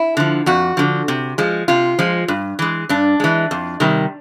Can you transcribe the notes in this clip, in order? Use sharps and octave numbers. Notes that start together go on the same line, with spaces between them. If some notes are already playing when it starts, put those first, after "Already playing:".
Already playing: E4
D3 F3
F2 F#4
D3 F3
C3
F3 G#3
C3 F4
F3 G#3
G2
E3 G#3
G2 D4
E3 G#3
F2
C3 D#3 G3